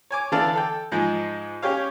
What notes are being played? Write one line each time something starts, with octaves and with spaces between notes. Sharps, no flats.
C#5 G#5 D6
D3 E3 D4 D5 F5 A5
A4 G5
G#2 F3 G#3
C#4 G4 C#5 F5